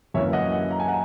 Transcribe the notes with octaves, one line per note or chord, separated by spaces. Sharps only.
F#2 E3 A#3 C#4 C#5 E5
D#5 F#5
D#5 F#5
A#5
G#5
F#5 A#5